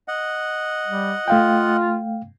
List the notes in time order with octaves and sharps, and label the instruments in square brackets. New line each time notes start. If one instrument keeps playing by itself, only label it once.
[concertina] D#5 F#5
[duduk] G3
[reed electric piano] A3 F5 G5 [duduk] F4